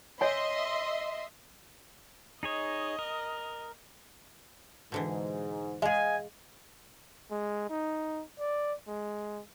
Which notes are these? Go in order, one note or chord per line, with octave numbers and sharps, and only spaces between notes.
C#5 D#5 E5 G#5 C6
D#4 G#4 C#5 D#5
A#4
G#2 B2 D3 E3
G#3 G#4 D#5 F5 G#5
G#3
D#4
D5
G#3